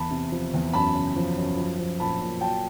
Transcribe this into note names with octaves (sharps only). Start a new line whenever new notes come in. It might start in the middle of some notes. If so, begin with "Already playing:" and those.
Already playing: E2 A5 B5
C3
F3
E2
F#2 A5 B5
C#3
F3
F#2
F3
F3
A#2 A5 B5
A#2
F#3 G5 A5